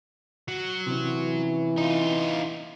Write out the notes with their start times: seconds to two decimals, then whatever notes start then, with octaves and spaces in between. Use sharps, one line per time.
0.48 F#3
0.86 C3 E3 C#4
1.78 D#4 F4